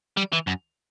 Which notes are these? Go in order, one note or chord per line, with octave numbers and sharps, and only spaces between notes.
G3
E3
F#2